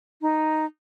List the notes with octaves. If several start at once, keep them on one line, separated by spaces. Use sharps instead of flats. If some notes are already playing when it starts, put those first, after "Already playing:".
D#4